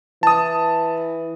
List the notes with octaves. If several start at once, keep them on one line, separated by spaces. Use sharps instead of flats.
E3 A5 D#6